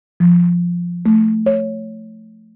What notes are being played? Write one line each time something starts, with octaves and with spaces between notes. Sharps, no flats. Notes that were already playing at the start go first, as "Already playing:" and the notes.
F3
A3
C#5